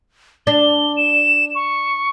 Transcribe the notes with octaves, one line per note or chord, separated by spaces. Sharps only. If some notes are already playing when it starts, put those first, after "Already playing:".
D4 G7
E7
C#6